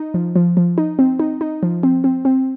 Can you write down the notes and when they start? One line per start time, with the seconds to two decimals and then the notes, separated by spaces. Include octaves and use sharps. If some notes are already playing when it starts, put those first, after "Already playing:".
Already playing: D#4
0.14 F3
0.36 F3
0.57 F3
0.78 D#4
0.99 C4
1.20 D#4
1.41 D#4
1.63 F3
1.83 C4
2.04 C4
2.25 C4